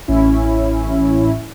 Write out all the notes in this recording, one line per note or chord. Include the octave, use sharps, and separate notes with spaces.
A1 C#4 E4